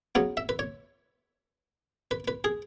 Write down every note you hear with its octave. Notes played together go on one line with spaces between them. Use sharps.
C#3 F#3 B3 C#5
E5
B4
C#5
B4
B4
G#4